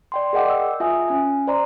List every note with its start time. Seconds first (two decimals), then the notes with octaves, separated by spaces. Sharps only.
0.12 D5 G5 C6
0.33 G#4 A#4 D#5 F#5 G5 D6
0.50 E6
0.80 F4 E5 G#5 D#6
1.08 C#4 G#5
1.47 C5 D5 A#5 C6